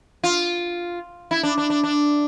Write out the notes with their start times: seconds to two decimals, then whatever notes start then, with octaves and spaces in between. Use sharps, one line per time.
0.24 F4
1.31 E4
1.43 D4
1.58 D4
1.70 D4
1.84 D4